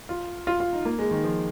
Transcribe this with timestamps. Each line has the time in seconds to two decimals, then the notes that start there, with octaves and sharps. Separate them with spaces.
0.09 F4
0.47 F4
0.60 F4
0.73 D#4
0.85 A#3
0.99 G#3
1.11 D#3
1.24 F3